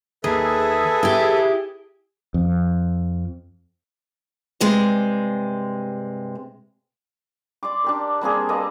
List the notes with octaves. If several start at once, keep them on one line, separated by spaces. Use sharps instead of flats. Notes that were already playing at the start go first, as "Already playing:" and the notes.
D#2 G#4 A4 B4 E5
E4 G4
F2
G2 C3 G#3
D5 C6 D6
D4 G4 A#4
G3 A#3 C4 G#4
A#3 A4 B4 D#5